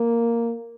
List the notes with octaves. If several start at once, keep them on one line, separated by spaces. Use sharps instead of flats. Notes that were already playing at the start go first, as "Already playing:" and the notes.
Already playing: A#3